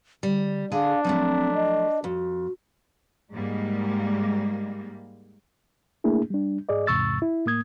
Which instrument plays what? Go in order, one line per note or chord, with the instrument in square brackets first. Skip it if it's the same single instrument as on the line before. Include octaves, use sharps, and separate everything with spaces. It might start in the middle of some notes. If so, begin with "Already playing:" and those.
[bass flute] D3 [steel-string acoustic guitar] G3
[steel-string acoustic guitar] D3 G#4 G#5 [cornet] D4 [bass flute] F5
[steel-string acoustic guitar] F3 F#3 A3 [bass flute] C4
[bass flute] D#5
[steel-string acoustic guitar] F2 [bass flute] F#4
[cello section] G#2 G3 G#3 A#3
[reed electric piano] A3 A#3 D4 E4 G#4
G3 D4
G#2 G#4 D5 D#5
E2 G#2 C3 C#6 E6 A6
E4
A2 A#3 D#6 G#6